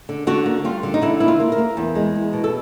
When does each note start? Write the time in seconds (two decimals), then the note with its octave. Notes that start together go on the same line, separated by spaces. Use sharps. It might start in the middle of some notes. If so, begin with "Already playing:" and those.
0.09 D3
0.27 D3 F#4
0.46 A#3
0.64 G3 F4
0.83 D3
0.94 D#4
1.02 D3 E4
1.20 A#3 E4
1.28 F4
1.40 A#3
1.52 A#4
1.58 A#3
1.77 E2
1.95 G#3
2.15 E2
2.33 B2
2.44 A4